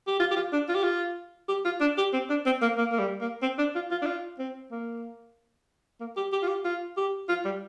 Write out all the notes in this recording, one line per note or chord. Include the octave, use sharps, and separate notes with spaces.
G4
F4
G4
F4
D4
F4
G4
F4
G4
F4
D4
G4
C4
D4
C4
A#3
A#3
A#3
G3
A#3
C4
D4
F4
F4
D4
F4
C4
A#3
A#3
G4
G4
F4
G4
F4
G4
F4
G3